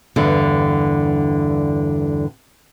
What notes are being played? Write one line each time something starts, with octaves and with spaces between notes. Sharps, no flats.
E2 G2 D3